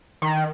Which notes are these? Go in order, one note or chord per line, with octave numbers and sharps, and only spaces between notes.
D#3